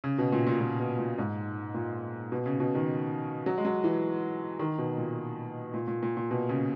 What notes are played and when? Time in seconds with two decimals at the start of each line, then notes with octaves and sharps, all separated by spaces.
0.04 C#3
0.18 B2
0.32 A#2
0.47 A#2
0.61 A#2
0.80 B2
0.99 A#2
1.18 G#2
1.74 A#2
2.32 B2
2.46 C#3
2.60 B2
2.75 D#3
3.46 F#3
3.58 G#3
3.65 F#3
3.84 E3
4.59 D#3
4.78 B2
4.98 A#2
5.74 A#2
5.88 A#2
6.03 A#2
6.17 A#2
6.31 B2
6.49 C#3